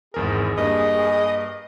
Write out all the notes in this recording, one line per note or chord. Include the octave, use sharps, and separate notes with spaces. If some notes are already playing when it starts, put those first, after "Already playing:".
G#1 E2 G#4 A#4
G2 A#3 D#5